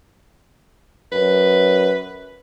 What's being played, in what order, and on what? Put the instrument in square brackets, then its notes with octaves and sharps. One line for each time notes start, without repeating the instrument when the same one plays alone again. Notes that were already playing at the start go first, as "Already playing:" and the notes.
[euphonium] F#2 [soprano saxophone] B4